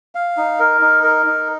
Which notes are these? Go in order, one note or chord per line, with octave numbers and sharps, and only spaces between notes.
F5
D#4
A#4
D#4
A#4
D#4